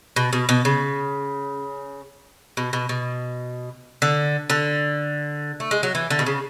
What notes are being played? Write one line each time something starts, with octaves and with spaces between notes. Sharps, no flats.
B2
B2
B2
C#3
B2
B2
B2
D3
D3
A3
G#3
F#3
E3
D3
B2
C#3